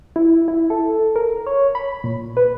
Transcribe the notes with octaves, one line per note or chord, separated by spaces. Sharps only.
E4
E4
A4
A#4
C#5
B5
A#2
B4